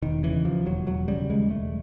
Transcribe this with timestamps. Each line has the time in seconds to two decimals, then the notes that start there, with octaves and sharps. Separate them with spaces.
0.02 E1 D#3
0.23 C#3 E3
0.45 D#2 F3
0.66 E1 F#3
0.87 E1 F#3
1.08 C#3 G3
1.29 D#2 G#3
1.50 E1 A3